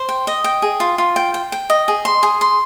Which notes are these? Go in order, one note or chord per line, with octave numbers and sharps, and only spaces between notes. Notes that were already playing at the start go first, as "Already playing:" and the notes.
Already playing: C5
G5
D#5
G5
G#4
F4
F4
G5
G5
G5
D#5
G#4
C6
G#4
C6